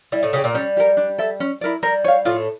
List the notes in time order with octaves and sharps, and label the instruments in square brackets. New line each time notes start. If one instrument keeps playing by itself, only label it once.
[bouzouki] G3 [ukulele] E4
[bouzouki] A2 A3
[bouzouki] C#3 C#4 [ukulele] G4 C#5 G5
[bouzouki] A#2 A#3
[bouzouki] G3 [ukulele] C#4
[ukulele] G4 A#4
D4
A4 E5
C#4
E4 A#4 D5
[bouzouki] G3 [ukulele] A#4
[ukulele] C#5 F5
[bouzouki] A2 A3 [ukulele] F4